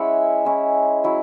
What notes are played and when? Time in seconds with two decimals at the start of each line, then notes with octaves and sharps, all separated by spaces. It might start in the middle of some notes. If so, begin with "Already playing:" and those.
Already playing: G#3 C#4 E4 E5 F#5
0.45 G#3 C#4 E4
1.04 F#3 C#4 E4